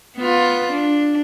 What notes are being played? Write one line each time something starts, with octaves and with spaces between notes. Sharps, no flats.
B3 F4
D4